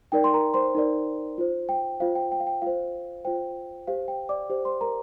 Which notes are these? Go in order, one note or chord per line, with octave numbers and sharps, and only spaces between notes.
D#4 A#4 D5 G5
C6
A#4 A#5
C5 C6
D#4 A#4 D5
F4 C5
G5
F4 C5 F5
G5
G5
F5
G5
F4 C5 F5
F4 C5 G5
G4 C5 F5
G5
D5 D6
G4 C5
C5 C6
A#4 A#5